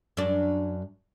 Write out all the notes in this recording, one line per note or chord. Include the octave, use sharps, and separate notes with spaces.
F#2 D4